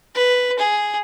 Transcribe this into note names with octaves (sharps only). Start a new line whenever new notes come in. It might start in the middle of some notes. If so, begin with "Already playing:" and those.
B4
G#4